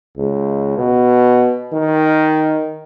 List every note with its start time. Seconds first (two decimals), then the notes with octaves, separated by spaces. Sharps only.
0.17 C#2
0.77 B2
1.73 D#3